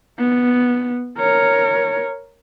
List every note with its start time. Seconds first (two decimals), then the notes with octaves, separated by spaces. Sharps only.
0.19 B3
1.17 A#4 C#5